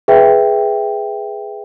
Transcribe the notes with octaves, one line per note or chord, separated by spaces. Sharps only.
G#4 B4 E5 G5